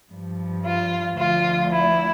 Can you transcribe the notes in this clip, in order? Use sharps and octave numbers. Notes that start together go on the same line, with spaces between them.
G2 F3
F4
D2 D3 F3 F4
E4